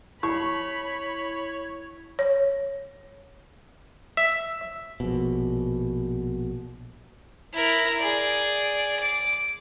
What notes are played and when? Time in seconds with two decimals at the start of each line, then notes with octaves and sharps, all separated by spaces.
0.23 E4 C#5 B5 C#6
2.19 C#5
4.17 E5
5.00 A#1 B2
7.52 E4 A#4
7.99 G#4 D5
9.00 D6